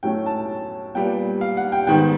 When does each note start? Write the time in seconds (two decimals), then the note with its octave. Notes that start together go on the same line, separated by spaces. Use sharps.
0.03 A2 F#3 A3 C#4 G5
0.26 A5
0.95 A#2 G3 B3 G5
1.41 F5
1.57 F#5
1.72 G5
1.87 G#2 D#3 G3 B3 G5